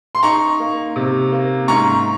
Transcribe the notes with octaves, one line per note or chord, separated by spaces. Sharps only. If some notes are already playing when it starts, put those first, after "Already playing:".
C6
D#4 A#5 C#6
A#3
C3
A#3
G#2 A#5 C#6